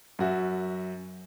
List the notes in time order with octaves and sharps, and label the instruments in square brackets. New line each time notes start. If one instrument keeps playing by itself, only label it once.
[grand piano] F#2 F#4 E5